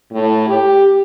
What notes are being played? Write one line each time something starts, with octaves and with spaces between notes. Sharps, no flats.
A2
G4